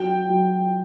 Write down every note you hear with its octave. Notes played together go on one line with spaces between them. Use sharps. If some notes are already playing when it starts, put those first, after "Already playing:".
Already playing: F#3 G5
F#3